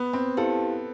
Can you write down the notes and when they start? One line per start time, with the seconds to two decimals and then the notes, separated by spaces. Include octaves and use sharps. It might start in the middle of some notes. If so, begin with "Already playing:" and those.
Already playing: B3
0.13 C4
0.37 E4 G4 A4 C5 F5 A5